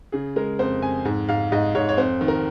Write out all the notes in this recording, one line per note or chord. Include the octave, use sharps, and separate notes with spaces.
C#3 G#4
G#3 A#4
F2 C5
F2 G#5
G#2
G#2 F5
G#2 D#5
G#2 C#5
C#5
F2 C5
D#3
A#4